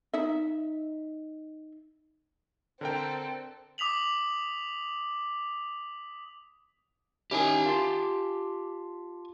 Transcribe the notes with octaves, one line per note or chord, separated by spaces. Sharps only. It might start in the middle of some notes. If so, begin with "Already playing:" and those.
D#4 E5
D3 C4 A4 A#4 G5
D6 D#6 B6 F7 F#7
D#3 C#4 E4 G4 G#5
F4 A5 C6